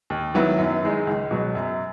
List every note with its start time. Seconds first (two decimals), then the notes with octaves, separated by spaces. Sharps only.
0.10 D#2
0.34 D#3 F#3 B3 E4
0.58 F#2
0.83 D#3 G#3 D#4
1.07 C#2
1.31 B2 F#3
1.55 F#2